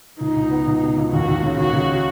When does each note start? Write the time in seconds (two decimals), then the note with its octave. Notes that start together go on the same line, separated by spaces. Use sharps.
0.20 C#2 D#4
0.36 C#2
0.51 B3
0.67 C#2
0.82 B2
0.97 C#2
1.12 D#2 F#4
1.28 D#2
1.43 C#3
1.58 D#2 F#4
1.73 C#3